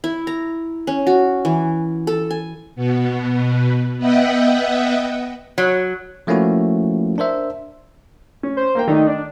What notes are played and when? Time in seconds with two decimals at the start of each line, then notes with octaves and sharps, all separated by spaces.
0.04 E4
0.27 A#5
0.87 C#4
1.07 F#4
1.45 E3
2.07 A4
2.30 G#5
2.75 B2 B3
3.97 B3 B4 D#5 E5 F#5 G5
5.58 F#3
6.27 F3 A3 A#3 C#4 E4 F#4
7.18 D4 A#4 C5 E5
8.43 C#4
8.57 C5
8.75 A#3 A#4 G5
8.88 D#3 A3 D4 D#4
9.07 D4 D5